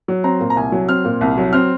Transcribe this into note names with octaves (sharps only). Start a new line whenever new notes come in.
F#3
C4 A#5
A#2
A#5
C2 G#5
F#3
C4 F6
A#2
C2
F#3
C4 F6